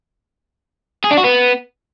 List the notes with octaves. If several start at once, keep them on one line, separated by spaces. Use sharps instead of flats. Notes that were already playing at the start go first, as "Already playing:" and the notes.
G#4
D4
F#4
B3